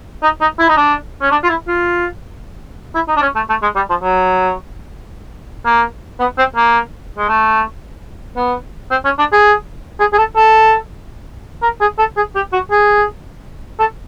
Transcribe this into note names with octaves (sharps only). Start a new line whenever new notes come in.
D#4
D#4
E4
D#4
D4
C#4
D4
F4
E4
F4
E4
D#4
D4
C#4
A3
A3
G#3
G3
F3
F#3
A#3
B3
C4
A#3
G#3
A3
B3
C4
C#4
D4
G#4
G#4
G#4
A4
A4
A#4
G#4
A4
G#4
G4
F#4
G#4
A4